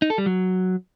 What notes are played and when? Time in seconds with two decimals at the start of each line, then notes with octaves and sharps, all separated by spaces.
0.02 D#4
0.10 A4
0.18 G3
0.26 F#3